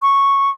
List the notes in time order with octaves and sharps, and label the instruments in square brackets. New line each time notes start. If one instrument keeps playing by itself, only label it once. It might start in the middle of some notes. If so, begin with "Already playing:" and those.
[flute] C#6